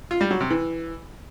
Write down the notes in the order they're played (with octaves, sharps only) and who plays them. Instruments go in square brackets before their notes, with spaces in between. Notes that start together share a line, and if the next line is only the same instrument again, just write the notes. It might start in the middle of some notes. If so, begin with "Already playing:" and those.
[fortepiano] F4
G3
F#3
C3
E3